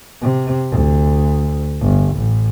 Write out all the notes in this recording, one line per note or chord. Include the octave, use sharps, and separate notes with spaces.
C3
D2
G1
A1